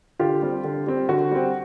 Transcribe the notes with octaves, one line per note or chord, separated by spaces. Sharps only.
D3 F4 G4
G3 C4
D3
G3 C4
D3 F#4
G3 C4